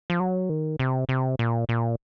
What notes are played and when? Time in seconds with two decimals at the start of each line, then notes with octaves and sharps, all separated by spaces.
0.10 F3
0.20 F#3
0.50 D#3
0.79 C3
1.09 C3
1.39 A#2
1.69 A#2